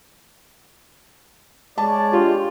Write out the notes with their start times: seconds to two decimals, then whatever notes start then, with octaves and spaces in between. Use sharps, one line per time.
1.78 G#3 C#5 D5 A5
2.13 D4 F4 G4